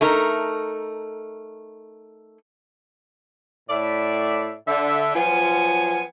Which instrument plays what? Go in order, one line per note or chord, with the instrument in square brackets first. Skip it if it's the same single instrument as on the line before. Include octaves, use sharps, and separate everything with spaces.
[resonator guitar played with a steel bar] A3 D#4 A#4
[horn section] A2 D5 E5
D3 E5
F3 F#3 B3 F4 G#5